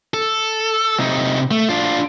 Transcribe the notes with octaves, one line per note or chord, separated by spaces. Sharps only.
A4
C3 D#4
A3
D4 F4